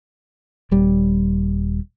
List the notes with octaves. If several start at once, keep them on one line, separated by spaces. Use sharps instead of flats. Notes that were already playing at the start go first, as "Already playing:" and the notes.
D#1 G3